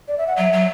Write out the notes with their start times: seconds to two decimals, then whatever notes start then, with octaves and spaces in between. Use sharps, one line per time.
0.08 D5
0.18 E5
0.27 F#5
0.38 F#3 E5
0.53 F#3